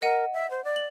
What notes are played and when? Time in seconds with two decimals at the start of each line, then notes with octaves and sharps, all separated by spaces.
0.02 A#4 D#5 F#5 D#7
0.33 E5
0.50 C5
0.64 D5
0.76 F#7